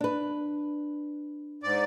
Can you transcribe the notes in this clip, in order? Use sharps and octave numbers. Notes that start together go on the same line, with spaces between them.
D4 B4
G#2 D5